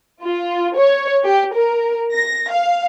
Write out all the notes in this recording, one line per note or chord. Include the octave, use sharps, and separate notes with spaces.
F4
C#5
G4
A#4
A#6
F5